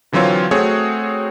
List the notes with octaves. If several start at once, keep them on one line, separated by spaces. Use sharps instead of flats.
D3 E3 F#3 C4 F4 C#5
A3 C4 F#4 G#4 C#5